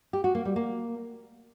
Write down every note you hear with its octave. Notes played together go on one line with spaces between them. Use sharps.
G4
F#4
A#3
G3
A#3